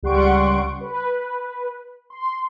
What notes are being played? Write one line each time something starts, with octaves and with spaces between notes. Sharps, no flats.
C#2 G3 F#5 C6 C#6 D7
B4
C6